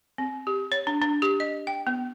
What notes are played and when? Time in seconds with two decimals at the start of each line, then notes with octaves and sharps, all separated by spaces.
0.18 C4
0.47 G4
0.72 C#5
0.87 D4
1.02 D4
1.22 G4
1.40 D#5
1.67 G5
1.87 B3